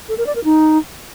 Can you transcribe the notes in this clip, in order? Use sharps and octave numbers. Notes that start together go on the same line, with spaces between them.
A4
A#4
D5
A#4
D#4